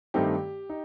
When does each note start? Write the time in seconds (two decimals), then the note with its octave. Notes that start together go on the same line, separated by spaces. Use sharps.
0.14 G2 D#3 A3 C4 D#4 G4
0.70 D#4